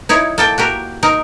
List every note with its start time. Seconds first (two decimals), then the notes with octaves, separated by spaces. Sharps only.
0.09 D#4 E4 C#5
0.38 A#3 A4 G5
0.58 F#4 G4 A#4
1.03 D#4 A#4